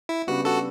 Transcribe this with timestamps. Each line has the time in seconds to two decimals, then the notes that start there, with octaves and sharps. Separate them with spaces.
0.09 E4
0.27 C#3 G3 B3 D4 F#4
0.45 F#4 A4